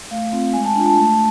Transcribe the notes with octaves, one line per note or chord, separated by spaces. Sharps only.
A3 F5
C4 F4
G#3 G#5
A5
D4 F4 G#5
A5
A3